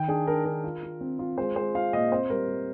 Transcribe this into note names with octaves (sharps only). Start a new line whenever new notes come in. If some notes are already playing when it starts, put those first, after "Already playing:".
Already playing: D#3 G5
D4 G#4
D4 A#4
D4 A#4
F4
F4
C4
F4
G#3 C5
G#3 C5
F4 F5
A#2 D#5
C4 C5
G3 A#4
G3